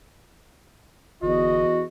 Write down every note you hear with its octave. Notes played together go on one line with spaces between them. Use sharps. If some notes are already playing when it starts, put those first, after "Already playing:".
G1 E2 F#4 D#5